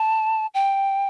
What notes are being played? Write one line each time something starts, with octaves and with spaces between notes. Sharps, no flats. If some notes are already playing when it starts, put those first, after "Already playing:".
Already playing: A5
G5